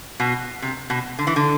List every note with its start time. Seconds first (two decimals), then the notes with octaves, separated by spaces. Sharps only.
0.20 B2
0.62 C3
0.90 B2
1.19 D3
1.27 E3
1.36 D3